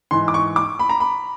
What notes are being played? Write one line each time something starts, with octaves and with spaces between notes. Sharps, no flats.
G#2 E3 C6
D6
C#6
D6
B5
A#5
B5